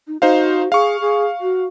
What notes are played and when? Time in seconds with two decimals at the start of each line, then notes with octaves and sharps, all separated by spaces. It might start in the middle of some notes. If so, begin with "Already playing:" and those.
0.07 D#4
0.22 D#4 F#4 C5 F5
0.72 G#4 F5 C#6
1.01 G#4
1.41 F#4